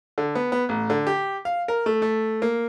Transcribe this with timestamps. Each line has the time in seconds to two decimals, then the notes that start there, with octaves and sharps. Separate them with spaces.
0.18 D3
0.35 B3
0.52 B3
0.69 A1
0.90 D3
1.07 G4
1.45 F5
1.68 A#4
1.86 A3
2.02 A3
2.42 A#3